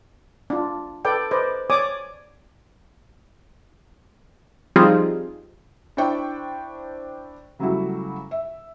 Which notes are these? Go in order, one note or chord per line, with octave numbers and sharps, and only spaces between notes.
D4 F4
A4 B4 D5 G5
B4 C5 D5 D#5
C#5 D5 G#5 D6 D#6
F3 G3 C4 D#4 F4 G#4
D4 E4 C5 D5 G5 C#6
C#3 F#3 G3 A3 E4 F#4
E5